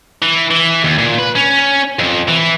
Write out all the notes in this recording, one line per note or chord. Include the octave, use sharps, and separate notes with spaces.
E3
E3
D#2
A#2
B4
C#4
F2
E3